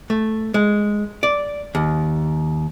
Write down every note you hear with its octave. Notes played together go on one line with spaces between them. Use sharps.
A3
G#3
D5
D#2